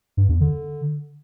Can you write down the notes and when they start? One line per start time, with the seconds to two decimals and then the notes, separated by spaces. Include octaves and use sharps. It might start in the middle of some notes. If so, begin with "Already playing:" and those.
0.17 G2
0.29 E2
0.41 D3